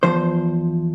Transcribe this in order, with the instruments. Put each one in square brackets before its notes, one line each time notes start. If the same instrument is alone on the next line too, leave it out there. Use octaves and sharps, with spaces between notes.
[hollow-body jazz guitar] E2 C3 F3 C5